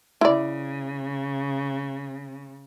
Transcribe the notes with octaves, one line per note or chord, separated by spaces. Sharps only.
C#3 E4 D5